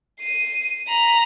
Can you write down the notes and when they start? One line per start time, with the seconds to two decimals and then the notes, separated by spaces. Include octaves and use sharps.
0.21 C7 D#7
0.88 A#5 B5